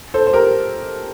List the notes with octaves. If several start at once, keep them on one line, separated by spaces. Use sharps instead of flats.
A4 C5
C5
G4 A#4